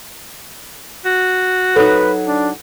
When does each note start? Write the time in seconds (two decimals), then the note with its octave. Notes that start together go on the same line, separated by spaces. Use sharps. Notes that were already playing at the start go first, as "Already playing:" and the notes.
1.05 F#4
1.76 F#3 D#4 A4 B4
2.28 D4